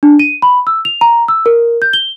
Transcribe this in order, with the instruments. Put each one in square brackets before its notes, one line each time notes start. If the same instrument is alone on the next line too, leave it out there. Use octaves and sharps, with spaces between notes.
[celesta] D4
D#7
B5
E6
F7
A#5
E6
A#4
G6
G7